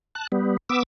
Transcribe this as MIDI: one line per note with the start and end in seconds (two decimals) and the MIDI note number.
0.15 0.27 81
0.15 0.27 90
0.32 0.57 55
0.32 0.57 59
0.70 0.83 59
0.70 0.83 86
0.70 0.83 88